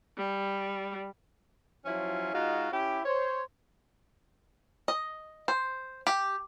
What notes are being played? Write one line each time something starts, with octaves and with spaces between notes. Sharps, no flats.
G3
F3 F#3 C#4 E4 F4
G#3 D#4 F4 F#4
C#4 E4 G4
C5 C#5
D#5
C5
G4